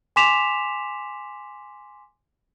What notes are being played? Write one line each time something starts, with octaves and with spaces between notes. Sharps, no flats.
G#5 C6 D6 B6 E7 F7